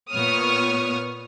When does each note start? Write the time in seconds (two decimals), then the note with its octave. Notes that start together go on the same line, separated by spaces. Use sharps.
0.12 A#2 B3 C#5 C#6 D#6 F6